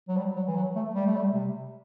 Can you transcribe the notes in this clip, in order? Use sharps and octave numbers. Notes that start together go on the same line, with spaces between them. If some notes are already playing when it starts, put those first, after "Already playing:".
F#3
G3
F#3
E3
F#3
A3
G3
A3
G3
C3